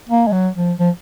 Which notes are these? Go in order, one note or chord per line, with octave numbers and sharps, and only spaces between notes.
A#3
G#3
F#3
F3
F3